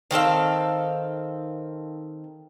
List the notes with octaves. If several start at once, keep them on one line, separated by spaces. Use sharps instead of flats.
D#3 C4 A4 F5